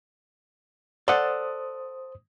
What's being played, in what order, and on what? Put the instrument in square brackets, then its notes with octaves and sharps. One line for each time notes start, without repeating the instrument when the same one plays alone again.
[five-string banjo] A4 F#5 [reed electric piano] C5 D#6 [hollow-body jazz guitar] D5